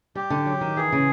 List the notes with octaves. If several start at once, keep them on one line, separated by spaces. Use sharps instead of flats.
G3 G4
D3
F#3
D#3
E3 G#4
C#3